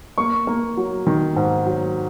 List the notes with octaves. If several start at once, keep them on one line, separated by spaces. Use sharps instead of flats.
A#3 C#6
A#3
F#3
D#3
G#2
F#3